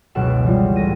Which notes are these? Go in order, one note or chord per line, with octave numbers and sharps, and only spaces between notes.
F#1 C#2 B2 F#5 D7 E7
C#3 E3 G3 F4
A1 C#4 A4 A#6 D#7